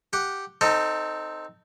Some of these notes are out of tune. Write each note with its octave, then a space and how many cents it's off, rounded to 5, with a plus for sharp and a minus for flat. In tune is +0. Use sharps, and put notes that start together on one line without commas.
G4 +0 F#5 +0
C4 +0 D#4 +0 A4 +30